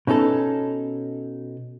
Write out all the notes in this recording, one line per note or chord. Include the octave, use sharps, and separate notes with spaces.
B2 C#4 D#4 A4